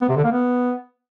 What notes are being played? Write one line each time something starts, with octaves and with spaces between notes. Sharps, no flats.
B3
C3
D3
A#3
B3